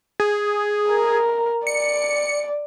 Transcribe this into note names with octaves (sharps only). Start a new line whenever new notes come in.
G#4
A#4
D5 C#7